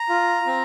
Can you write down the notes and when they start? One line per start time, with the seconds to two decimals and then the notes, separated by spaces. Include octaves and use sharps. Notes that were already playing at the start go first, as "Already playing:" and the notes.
Already playing: A#5
0.09 F4
0.47 C4